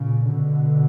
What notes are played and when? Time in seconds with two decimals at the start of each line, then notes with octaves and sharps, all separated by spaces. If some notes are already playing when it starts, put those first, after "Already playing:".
Already playing: A#2 C#3
0.26 B2 D3